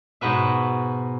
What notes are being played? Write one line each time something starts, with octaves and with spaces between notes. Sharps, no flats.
G#2 B2 F#4 B4 E5